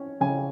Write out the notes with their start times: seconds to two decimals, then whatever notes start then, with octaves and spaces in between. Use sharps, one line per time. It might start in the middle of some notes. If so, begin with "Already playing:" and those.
Already playing: C#4 C#5
0.21 C#3 G#5